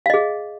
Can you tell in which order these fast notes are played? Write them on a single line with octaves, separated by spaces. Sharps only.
F5 D#5 G#4